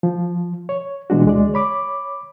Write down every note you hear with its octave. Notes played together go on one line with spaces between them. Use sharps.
F3
C#5
B2 E3 G#3 D4 F#4
D2 G#3 D5
C#5 B5 D6